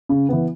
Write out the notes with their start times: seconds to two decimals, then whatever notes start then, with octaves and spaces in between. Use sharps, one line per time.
0.09 C#3
0.29 E3 B3